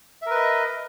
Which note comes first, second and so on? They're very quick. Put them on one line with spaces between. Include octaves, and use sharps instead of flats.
E5 A#4 B4 D#5